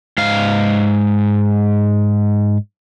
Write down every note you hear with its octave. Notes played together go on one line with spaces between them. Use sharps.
G#2 F5